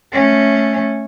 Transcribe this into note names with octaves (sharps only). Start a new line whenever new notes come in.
A3 C#4